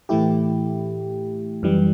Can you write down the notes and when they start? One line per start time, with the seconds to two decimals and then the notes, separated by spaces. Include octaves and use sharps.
0.09 A2 E3 A3 E4 G4
1.63 F#2 E3 G3